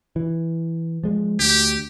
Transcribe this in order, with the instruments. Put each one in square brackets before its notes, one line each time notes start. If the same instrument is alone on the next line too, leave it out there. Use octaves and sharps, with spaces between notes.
[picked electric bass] E3
F3 G#3
[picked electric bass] D2 [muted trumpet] G4